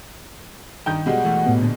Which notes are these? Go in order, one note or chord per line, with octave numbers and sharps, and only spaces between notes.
G2 D#3 D#4 G5 G6
B2 G3 G#3 F#5
E3 A3
A2 B3
A#2 D3